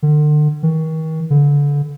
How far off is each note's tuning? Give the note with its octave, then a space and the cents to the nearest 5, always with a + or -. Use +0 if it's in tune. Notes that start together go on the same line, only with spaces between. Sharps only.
D3 +40
D#3 +40
D3 -30